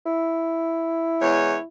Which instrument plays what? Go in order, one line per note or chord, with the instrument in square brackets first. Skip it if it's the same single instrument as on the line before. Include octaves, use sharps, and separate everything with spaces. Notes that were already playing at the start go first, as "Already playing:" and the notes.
[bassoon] E4
[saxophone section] E2 G#3 C#5